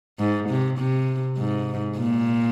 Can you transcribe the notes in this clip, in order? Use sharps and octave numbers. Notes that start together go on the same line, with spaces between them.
G#2
C3
C3
G#2
A#2